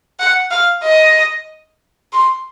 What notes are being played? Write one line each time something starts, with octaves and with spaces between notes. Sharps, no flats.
F#5
F5
D#5
C6